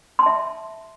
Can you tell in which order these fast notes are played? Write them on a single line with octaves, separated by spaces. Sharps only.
C6 A5 E5